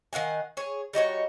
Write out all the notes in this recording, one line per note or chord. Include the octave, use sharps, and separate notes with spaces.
D#3 F5 F#5 G#5
G#4 C#5
G3 D#4 F#4 C#5